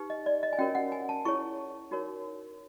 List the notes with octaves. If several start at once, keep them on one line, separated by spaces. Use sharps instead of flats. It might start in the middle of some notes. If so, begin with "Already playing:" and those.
Already playing: D#4 G4 B4
D#5
D5
D#5
G#5
C#4 F#4 A#4 C#5 G5
F#5
G#5
A5
E4 G#4 C#5 C#6
D#4 F#4 A#4 C#5